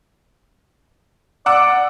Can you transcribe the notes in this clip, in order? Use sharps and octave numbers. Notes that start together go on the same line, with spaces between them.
D5 F#5 D6 E6